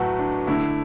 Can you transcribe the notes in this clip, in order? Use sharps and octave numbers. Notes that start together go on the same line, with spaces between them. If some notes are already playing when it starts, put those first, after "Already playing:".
Already playing: A2 F#3 A3 F#4 B4
D4
D3 A3 E4